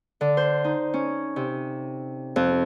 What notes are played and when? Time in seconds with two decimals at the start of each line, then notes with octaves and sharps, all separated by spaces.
0.21 D3
0.37 C5
0.64 D#4
0.94 C#4
1.36 C3
2.36 F2